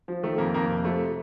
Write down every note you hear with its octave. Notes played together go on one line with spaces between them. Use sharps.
F3
D#3 A3
F2 A#3
F2 A#3
C3
F3 A3